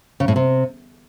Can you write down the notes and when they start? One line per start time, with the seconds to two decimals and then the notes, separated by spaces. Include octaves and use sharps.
0.20 C#3
0.28 A2
0.36 C3